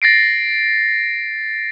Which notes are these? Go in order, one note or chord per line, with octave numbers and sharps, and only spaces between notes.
A6 A#6 C7 D7